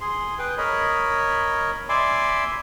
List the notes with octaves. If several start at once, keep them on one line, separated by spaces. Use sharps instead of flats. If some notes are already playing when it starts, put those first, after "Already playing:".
G#4 C6
G#4 B4 G5
A#4 C#5 D#5 B5
D5 E5 G#5 B5 C6 D6